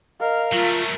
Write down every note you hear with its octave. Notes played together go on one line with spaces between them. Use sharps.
A#4 D#5 F5
F#3 A3 F4